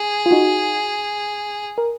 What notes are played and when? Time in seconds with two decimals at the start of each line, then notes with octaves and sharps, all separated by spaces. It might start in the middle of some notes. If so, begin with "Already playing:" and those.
Already playing: G#4
0.26 F4
0.31 D#4 F#4
1.78 A#4